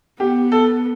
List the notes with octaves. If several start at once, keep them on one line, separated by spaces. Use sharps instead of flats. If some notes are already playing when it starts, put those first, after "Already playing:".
B3 G4
A4